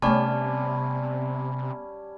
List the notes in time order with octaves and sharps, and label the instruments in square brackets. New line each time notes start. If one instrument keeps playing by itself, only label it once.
[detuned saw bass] C3 [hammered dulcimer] G3 C#4 [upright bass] A3 B3 [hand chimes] D5 A5